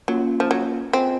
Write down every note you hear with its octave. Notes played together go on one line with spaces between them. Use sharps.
F#3 A#3 C#4 F4
F3
F#3
C4 F4 G#4 D#5 G#5